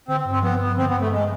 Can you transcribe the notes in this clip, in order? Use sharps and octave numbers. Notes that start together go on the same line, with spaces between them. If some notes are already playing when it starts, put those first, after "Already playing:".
D3 C4
G2
C4
F3 B3
G2 B3
D3 C4
B3
G2
A3
F3 G#3